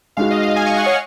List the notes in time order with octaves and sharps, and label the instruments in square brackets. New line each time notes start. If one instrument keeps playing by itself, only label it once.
[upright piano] G#3 D#4 F#4 [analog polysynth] F5
[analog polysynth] D#5
F5
G#5
C#6
F#5
C#5